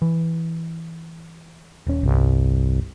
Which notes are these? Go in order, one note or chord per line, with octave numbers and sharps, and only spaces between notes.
E3
D#1 C#4
G1 C2